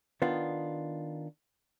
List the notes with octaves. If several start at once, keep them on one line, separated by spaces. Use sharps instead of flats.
D#3 B3 D4 F4